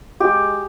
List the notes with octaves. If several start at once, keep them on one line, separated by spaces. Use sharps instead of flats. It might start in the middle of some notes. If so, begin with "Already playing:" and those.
G#3 G4